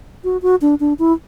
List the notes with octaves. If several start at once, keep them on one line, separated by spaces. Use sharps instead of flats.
F#4
F#4
D4
D4
E4